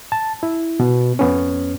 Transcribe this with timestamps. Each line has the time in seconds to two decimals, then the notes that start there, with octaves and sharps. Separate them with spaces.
0.12 A5
0.43 E4
0.80 B2
1.19 F2 B3 C#4